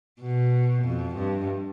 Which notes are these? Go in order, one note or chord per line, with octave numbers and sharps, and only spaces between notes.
B2
F2
G2